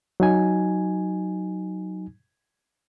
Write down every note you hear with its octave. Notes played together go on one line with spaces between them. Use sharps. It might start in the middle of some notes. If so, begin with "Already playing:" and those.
F#3 D#4 G#5